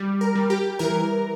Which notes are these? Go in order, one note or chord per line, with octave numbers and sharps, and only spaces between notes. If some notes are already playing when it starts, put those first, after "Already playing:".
Already playing: G3
A#4
G3
G4
E3 A#4